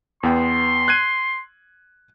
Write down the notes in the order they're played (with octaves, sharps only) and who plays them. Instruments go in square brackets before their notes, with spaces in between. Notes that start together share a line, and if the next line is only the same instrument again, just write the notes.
[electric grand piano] E2 B3 G5 [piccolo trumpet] C6
[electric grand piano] F#6 G#6 D#7